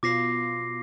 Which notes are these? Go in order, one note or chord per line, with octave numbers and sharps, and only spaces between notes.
B2 B3 F4 D6 A#6 C7